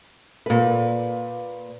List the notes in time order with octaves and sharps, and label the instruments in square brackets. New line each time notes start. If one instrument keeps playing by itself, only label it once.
[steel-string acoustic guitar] A#2 B4